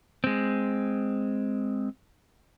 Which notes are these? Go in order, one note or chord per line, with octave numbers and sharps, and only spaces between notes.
G#3 C4